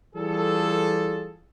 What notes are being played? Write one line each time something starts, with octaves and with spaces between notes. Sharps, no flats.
E3 G3 F4 G#4 A4